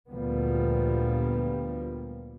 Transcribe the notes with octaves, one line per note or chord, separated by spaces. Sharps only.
D2 A#2 F3 G3 A#3 B3